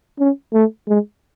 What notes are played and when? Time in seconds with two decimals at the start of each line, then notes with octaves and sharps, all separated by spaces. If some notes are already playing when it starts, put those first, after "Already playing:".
0.19 C#4
0.54 A3
0.88 G#3